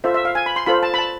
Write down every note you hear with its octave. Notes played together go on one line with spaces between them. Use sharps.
F4 A4 C5 E5
E5
F5
G#5
B5
C6
F4 A4 C5 B5
A5
B5
A5